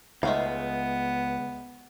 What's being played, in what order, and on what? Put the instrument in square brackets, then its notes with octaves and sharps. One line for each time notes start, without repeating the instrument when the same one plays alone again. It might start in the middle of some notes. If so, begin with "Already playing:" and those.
[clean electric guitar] C#2 [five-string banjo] G#3 A3 F5 [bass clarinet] B3